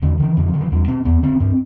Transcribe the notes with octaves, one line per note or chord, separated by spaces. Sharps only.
E2 D3
D3 E3
F2 D3
F3
D3
F3
E2 G3
B2 C4
E2 B3
D3 C4
G2 C4